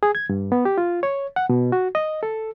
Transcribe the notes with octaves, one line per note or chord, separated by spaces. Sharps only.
G#4
G#6
G2
B3
G4
F4
C#5
F#5
B2
F#4
D#5
A4